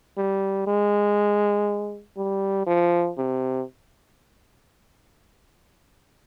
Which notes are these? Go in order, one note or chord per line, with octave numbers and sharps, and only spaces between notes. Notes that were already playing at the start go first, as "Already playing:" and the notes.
G3
G#3
G3
F3
C3